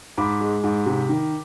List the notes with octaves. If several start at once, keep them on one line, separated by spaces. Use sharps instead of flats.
G#2 B5 D6
G#3
G#2
C3
D#3